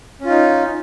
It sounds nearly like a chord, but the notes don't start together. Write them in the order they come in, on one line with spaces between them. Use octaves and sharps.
C#4 F4 D#4